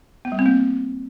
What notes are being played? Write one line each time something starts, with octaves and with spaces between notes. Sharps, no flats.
B3
G3
C4
A#3